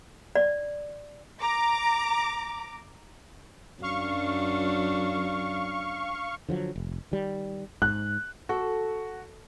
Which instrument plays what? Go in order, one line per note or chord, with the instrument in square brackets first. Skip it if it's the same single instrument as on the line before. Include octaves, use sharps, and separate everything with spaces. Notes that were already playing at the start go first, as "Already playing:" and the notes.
[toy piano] D5
[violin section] A#5 D6
[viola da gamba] F#2 F#3 D4 [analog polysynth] F5 C#6
[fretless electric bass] D3 F3 F#3
F1
D#3 G3
[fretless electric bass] G#2 [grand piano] F#6
[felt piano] F#4 [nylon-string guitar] A4